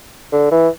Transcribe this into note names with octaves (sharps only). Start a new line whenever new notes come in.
D3
E3